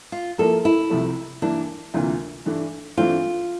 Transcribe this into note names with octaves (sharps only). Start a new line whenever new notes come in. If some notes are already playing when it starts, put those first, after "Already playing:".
F4
F3 A#3 E4 A4 A#4
E4
C2 C3 F3 A3
G2 E3 A#3 D4 E4
D2 C3 E3 A#3 F4
G2 E3 A3 D4
G2 E3 A3 C4 F4